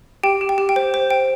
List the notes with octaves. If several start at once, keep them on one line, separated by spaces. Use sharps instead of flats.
G4 G5
G4
G5
G4
G5
C5
C5
G5